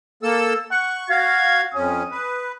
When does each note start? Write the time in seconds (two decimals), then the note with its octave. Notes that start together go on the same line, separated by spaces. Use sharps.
0.23 A#3 A4 E6
0.71 F#5 C#6
1.10 F#4 F5 G#6
1.74 F2 C#4 D#6
2.11 B4